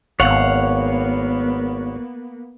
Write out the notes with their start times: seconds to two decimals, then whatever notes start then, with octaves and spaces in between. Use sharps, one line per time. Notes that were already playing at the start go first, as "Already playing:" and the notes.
0.20 G#1 A#3 B3 C#5 F5 F#5